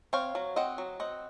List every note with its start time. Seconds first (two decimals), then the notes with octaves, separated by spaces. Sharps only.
0.13 C4 C#5 F5
0.35 F#3
0.56 C4 D#5 F#5
0.78 F#3
1.00 C4 D#5 F#5